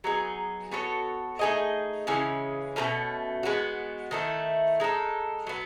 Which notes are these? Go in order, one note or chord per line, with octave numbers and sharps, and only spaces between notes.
F#3 B3 D#4 G#4
B3 F#4 A4 C#5
A3 D#4 G#4 D#5
C#3 E3 G#3 C#4
B2 F#3 A3 C#4
G#3 B3 F#4
D#3 A3 E4
G#3 D#4 A4
F#3 B3